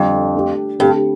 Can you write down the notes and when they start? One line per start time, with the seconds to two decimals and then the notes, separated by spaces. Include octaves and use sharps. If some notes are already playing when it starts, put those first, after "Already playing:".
Already playing: F2 D3 G3 D4
0.35 A3 D4 G4
0.79 G2 D3 A3 C4